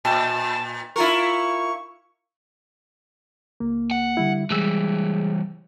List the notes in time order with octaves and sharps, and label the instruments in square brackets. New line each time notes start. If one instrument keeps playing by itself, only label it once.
[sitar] A#2 [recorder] A5
[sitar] E4 F4 A#4 [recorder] C#6
[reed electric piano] C#2 A#3
[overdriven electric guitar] F#5
[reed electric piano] D3 G3 E4
[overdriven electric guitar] E3 G3 [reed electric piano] G#3 G#4 E6